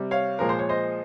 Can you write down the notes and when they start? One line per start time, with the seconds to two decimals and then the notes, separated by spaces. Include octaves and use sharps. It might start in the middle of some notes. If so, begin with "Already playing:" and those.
Already playing: C3 G3
0.11 C#5 F5
0.39 A#2 F3 G#3 A#4
0.49 C5
0.59 C#5
0.69 C5 D#5